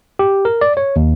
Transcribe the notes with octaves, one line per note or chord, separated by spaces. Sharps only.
G4
A#4
D5
C#5
D#2